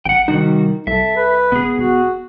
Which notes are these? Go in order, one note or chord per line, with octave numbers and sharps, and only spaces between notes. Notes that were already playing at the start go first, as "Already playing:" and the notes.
A1 F#5 G5
C3 D#3 G3 D#4 F#4
C2 A4 E5
B4
E1 B3 G#4
E1 F#4